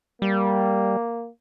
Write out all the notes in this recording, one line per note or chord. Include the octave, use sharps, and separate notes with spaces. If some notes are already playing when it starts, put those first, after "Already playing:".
G3 A#3